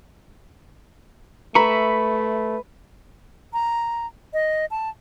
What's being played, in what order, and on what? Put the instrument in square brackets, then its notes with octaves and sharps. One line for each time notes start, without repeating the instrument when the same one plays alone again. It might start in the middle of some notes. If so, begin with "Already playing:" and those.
[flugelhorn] A3 [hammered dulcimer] B4 [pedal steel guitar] E5 B5 C#6 [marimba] A#5
[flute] A#5
D#5
A5